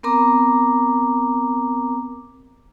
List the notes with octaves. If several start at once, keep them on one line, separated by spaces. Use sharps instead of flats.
B3 C4 A#4 A#5 D6